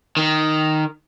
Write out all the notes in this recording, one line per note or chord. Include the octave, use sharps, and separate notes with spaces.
D#3